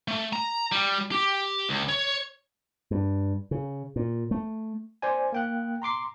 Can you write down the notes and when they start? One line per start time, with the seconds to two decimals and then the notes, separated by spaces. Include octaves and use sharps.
0.08 A3
0.33 A#5
0.72 G3
1.12 G4
1.69 C#2
1.89 C#5
2.91 G2
3.51 C#3
3.96 A#2
4.31 A3
5.02 C5 D5 G#5
5.32 A#3 G5 F#6
5.82 A#5 C6 D6 C7